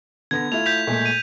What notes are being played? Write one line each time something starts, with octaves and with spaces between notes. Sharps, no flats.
D3 B3 G#6 A#6
A3 E4 F4 F7
G6 B6 F7
A#2 G#3 A3
D#7